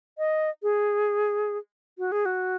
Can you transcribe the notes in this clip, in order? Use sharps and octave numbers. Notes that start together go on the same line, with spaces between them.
D#5
G#4
F#4
G#4
F#4